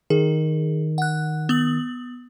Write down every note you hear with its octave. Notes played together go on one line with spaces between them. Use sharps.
D#3 G#4
F#5 F#6
B3 D#6 F#7